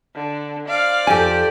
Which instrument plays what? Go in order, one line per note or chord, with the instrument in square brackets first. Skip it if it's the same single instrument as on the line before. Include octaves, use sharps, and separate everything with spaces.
[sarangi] D3
[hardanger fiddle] C5 D5 [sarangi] F5
[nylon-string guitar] F2 A4 [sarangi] G4 [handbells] G#5